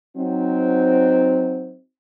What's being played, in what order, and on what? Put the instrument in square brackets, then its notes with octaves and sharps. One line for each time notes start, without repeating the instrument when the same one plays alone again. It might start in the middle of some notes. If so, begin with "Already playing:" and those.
[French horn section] F#3 C4 D#4